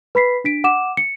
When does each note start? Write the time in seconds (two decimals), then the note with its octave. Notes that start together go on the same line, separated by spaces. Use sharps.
0.15 B4 B5 B6 C7
0.44 D4 B6 D7
0.64 F#5 D6 E7
0.97 C#7